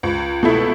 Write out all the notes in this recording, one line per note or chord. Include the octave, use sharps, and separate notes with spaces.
C#2
B2 A3 E4